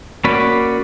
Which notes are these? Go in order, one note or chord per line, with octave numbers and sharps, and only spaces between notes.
A#3 C#4 F#4 D5 B5